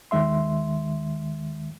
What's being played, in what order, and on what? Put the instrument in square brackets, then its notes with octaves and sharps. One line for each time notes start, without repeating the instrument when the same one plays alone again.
[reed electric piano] D#2 D#3 G#3 E5 C6